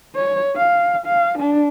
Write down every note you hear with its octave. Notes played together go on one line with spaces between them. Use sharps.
C#5
F5
F5
D4